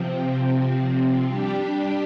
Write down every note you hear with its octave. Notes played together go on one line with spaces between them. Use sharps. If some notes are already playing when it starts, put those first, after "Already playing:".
Already playing: C3 F3 C4
G3 D4 G4